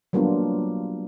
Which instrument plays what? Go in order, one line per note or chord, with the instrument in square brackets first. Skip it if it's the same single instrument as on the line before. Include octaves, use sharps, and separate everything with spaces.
[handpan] F#3 G3 A#3 B3 D4 F4